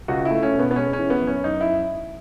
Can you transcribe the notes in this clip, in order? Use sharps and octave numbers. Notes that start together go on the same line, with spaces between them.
C#2 F#4
E4
A3
C#4
B2
B3
B3
G#3 C#4
E3 C#4
B3
F#2
C#4
F#2 D#4
E4